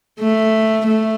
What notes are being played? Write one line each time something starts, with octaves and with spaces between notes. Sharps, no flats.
A3
A3